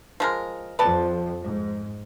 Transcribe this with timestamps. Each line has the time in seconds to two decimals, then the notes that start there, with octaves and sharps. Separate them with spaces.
0.20 F3 G#3 A#4
0.79 F2 F3 B4 D5 A5
1.43 G#2